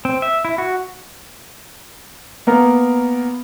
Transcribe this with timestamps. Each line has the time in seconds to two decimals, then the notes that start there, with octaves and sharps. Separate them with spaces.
0.05 C4
0.22 E5
0.45 E4
0.58 F#4
2.47 A#3 B3 A#4